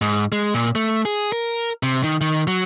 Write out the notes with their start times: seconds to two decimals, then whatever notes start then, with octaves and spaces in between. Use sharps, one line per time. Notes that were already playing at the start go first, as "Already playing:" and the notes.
0.02 G#2
0.32 G#3
0.54 A#2
0.75 A3
1.05 G#4
1.32 A#4
1.83 C3
2.04 D#3
2.21 D#3
2.47 F#3